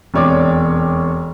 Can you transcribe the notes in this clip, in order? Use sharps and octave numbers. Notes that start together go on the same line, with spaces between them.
E1 F2 C#5 D5 D6